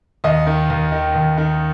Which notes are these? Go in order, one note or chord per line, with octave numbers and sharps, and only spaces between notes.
D#2 D#5
D#3
D#2
D#3
D#2
D#3